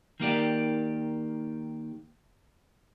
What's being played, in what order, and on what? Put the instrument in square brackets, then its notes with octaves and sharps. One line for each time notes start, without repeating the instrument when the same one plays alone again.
[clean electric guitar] D#3 A#3 G4 D5